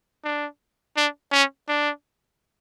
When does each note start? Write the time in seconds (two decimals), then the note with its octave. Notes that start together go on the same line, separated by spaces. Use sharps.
0.24 D4
0.97 D4
1.32 C#4
1.68 D4